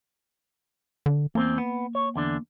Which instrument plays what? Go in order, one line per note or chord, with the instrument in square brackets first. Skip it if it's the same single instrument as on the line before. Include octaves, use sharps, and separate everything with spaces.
[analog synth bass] D3
[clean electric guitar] E2 C4 [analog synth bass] A#3
[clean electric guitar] B3
C#5
E2 D3 D4